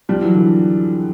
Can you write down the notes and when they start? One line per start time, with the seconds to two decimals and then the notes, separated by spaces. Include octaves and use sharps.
0.09 F3 G3
0.21 E3 F#3
0.35 D3 E3